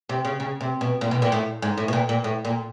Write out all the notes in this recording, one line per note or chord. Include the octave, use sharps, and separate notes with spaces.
C3
C#3
C#3
C3
B2
A#2
B2
A#2
A2
G#2
A2
B2
A#2
A#2
A2
A#2